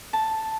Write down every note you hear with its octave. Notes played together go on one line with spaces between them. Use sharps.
A5